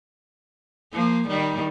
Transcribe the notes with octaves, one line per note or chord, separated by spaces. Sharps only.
F3 A#3
D#3 G3